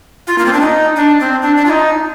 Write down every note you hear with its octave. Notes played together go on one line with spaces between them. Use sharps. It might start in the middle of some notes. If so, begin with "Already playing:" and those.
F4
A#3
C4
D4
D#4
D4
C4
D4
D4
F4
D#4